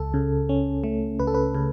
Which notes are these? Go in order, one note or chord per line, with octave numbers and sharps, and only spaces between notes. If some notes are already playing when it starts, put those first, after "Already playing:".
Already playing: C#2 A4
C#3
C#4
A3
C#2 B4
A4
B4
C#3